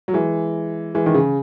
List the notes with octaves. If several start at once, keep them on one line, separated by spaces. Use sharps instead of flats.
F#3
E3 G#3
E3 G#3
D#3
C#3